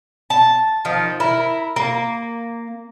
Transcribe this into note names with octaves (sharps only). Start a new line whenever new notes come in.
A5
D#3 F3
E4 A#4
A#3